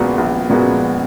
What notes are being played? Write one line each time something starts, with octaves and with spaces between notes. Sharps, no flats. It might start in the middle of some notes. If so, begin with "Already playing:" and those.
Already playing: A#1 A#2 G#3 B3 F#4
A#1
A#2 G#3 B3 F#4